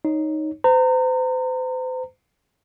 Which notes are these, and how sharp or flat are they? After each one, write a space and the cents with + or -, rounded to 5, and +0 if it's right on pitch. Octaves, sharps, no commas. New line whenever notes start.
D#4 +0 C#5 +0
C5 -40 A#5 -30